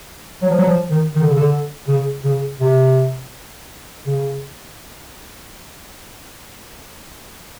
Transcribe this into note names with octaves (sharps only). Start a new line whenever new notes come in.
F#3
F3
F#3
F3
D#3
D#3
D3
C#3
D3
C#3
C#3
C3
C#3